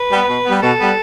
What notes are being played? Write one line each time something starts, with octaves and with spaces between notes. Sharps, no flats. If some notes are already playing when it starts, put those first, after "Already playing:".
Already playing: B4
G3 B3
B2
G3 B3
B2 A4
G3 B3